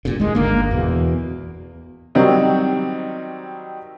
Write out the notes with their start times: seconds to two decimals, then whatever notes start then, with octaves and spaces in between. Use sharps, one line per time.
0.05 G2 A#2 C#3
0.20 D#2 D#3 G#3
0.35 G1 G#2 D3 A#3
0.71 E2 B2
2.15 D#3 F#3 G3 C4 D#4